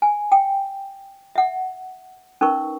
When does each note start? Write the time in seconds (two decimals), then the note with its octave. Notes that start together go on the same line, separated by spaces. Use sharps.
0.02 G#5
0.32 G5
1.36 E5 F#5
2.41 C#4 D#4 A#4 B4 C#6